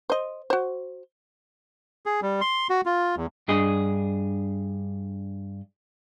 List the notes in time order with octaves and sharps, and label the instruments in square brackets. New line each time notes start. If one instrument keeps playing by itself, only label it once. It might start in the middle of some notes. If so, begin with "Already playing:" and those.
[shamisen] C5 D#5
F#4 C5
[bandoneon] G#4
G3
C6
F#4
F4
E2
[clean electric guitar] G2 D4 G#4 D#5